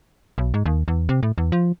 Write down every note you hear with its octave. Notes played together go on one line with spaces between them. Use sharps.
B1
G#2
D#2
E2
C3
A2
E2
F3